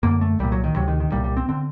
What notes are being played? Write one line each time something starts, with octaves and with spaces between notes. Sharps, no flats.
F#2 D3 A#3
A3
C2 A#2 G3
F#3
D#3
D2 C3 F#3
D#3
D#3
C2 A#2 G3
G3
C4
D3 C4